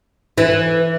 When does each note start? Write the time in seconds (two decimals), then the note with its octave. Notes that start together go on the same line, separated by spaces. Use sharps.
0.38 E3